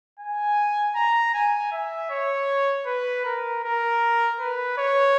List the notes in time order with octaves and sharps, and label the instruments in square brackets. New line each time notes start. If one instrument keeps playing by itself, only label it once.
[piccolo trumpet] G#5
A#5
G#5
E5
C#5
B4
A#4
A#4
B4
C#5